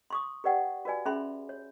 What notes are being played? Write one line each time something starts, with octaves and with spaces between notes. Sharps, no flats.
C6 C#6 D#6
G4 B4 D5 F#5 G5
F#4 B4 D5 G#5
C#4 G#4 E5 B5 C6
C#5